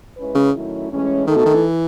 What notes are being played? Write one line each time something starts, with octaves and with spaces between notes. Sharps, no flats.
G#3 C#4 E4 B4
C#3
D#3 F#3 A3 C#4 E4
A2 E3 G#3 C#4
D#3 A3 D#4 A4
B2
D#3
E3